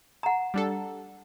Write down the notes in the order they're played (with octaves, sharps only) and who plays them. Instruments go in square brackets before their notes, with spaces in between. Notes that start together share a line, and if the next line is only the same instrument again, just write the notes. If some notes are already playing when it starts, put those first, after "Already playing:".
[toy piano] F#5 A#5
[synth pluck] G3 D4 A4